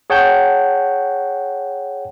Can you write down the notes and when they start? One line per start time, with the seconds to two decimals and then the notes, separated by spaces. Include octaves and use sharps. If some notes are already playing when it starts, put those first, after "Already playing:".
0.10 G#4 C#5 F#5 G5 A5 G6